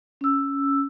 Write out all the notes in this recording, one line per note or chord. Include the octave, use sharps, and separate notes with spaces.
C#4 E6